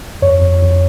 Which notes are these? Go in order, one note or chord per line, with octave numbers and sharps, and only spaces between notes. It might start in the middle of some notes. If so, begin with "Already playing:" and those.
F2 C#5
F2
F2